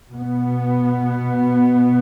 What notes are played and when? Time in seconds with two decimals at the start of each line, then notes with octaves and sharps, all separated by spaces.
0.12 B2 B3